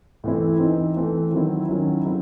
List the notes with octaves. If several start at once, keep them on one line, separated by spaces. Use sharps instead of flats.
A2 E3 C4 E4
E3 C4 D#4
E3 A3 C4
D#3 F#3 C4 E4
D#3 F#3 C#4 E4
C#3 F#3 C4 E4